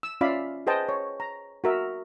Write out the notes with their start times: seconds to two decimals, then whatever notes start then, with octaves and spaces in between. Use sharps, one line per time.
0.03 E6
0.21 C#4 F4 D5 E5 F5 B5
0.67 G#4 B4 C5 D#5 G5 A5
0.89 C#5
1.20 A#5
1.64 F#4 A#4 E5